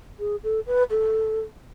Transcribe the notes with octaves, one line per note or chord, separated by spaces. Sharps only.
G#4
A4
B4
A4